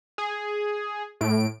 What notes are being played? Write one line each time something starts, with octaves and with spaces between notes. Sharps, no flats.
G#4
A2 D7